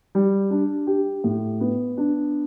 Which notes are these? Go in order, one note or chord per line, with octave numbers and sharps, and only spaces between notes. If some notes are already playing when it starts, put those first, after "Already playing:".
G3
D4
G4
A2
B3
D4